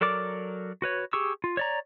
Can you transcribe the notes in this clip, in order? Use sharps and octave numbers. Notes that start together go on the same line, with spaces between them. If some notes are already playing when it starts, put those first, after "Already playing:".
F#3 A4 A#4 D5 D6
F#4 B4 C#5
G4 G#4 C#6 E6
F4
C#5 D5 A#5